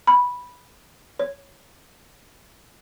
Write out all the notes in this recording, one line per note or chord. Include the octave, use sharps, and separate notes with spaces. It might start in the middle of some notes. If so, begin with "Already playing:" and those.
B5
C#5